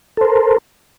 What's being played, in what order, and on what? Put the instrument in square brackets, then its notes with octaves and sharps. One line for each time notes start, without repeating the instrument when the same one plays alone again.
[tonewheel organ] A4
C5
A#4